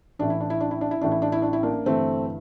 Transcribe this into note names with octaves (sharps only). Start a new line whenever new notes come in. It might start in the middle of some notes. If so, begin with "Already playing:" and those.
A1 A2 E3 D4
E4
D4
E4
D4
E4
D4
E4
A1 A2 E3 D4
E4
D4
E4
D4
E4
A#3 D4
G1 G2 E3 A3 C4